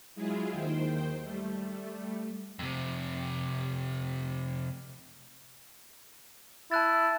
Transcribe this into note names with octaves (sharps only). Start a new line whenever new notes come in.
F#3 G#3 E4 F4 G#4
D#2 D#3 C5 G5
G3 A3
F2 C3
E4 A5 F#6 A6